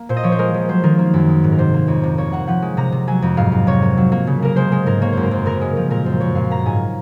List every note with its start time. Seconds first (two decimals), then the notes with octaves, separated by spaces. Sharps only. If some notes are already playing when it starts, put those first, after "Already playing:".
Already playing: A#3
0.09 A#2 C5
0.17 D#5
0.23 F3 C#5
0.32 C5
0.39 G#3 A#4
0.54 F3
0.69 F#3 C5
0.83 D#3 A#4
0.99 A#3
1.14 F#2
1.28 G#3
1.44 G#2
1.52 A#4
1.59 C3 C5
1.74 A#3
1.88 F2 C#5
2.04 C3
2.18 A#3 C#5
2.32 A#3 F#5
2.47 F3 F#5
2.62 G#3
2.77 C3 A#5
2.92 C3
3.07 F#3 G#5
3.22 F2
3.37 G#2 F5
3.52 G#2
3.67 C3 C#5
3.82 A#3
3.97 F#3
4.12 A#3
4.27 C#3
4.42 A#3 A#4
4.56 G#3 C5
4.72 G#3
4.86 G#2 A#4
5.02 A#3 C#5
5.12 F#2 C5
5.23 A#4
5.31 F#2 C5
5.46 C#3 A#4
5.61 G#3
5.76 F3 A#4
5.90 A#2 A#4
6.06 F#2 C5
6.20 F#2 C#5
6.35 A#2 F5
6.51 A#3 A#5
6.66 G#2 G#5